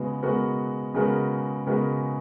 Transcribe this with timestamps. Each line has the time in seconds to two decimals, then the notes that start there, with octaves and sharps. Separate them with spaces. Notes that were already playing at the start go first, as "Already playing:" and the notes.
Already playing: C#3 G#3 B3 F#4
0.23 C#3 G#3 B3 F#4 A#4
0.94 C#3 G#3 B3 F#4 A#4
1.66 C#3 G#3 B3 F#4 A#4